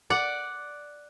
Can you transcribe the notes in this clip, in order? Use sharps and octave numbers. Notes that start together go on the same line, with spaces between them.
D5 F#5